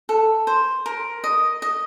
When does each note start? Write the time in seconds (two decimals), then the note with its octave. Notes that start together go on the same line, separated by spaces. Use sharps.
0.09 A4
0.47 C5
0.86 A#4
1.24 D#5
1.62 D#5